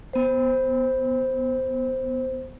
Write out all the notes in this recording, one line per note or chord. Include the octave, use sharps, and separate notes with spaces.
B3 C5